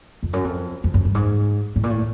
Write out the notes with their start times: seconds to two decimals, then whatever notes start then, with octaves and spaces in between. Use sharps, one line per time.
0.23 F2
0.33 F#2
0.44 F2
0.84 F2
0.94 F#2
1.05 G2
1.15 G#2
1.76 A2
1.83 A#2
1.90 A2